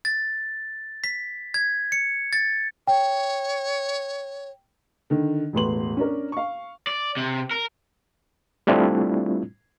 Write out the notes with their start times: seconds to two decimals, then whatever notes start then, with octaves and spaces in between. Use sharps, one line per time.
0.05 A6
1.04 B6
1.54 G#6
1.92 C#7
2.33 A6
2.87 C#5 G5
5.10 D3 D#3
5.53 E1 A1 A2 B4 C6 F#7
5.97 C#4 D4 A#4
6.32 F5 C#6
6.87 D5
7.17 C3
7.51 A#4
8.67 G3 A3 C4 D4 E4 F4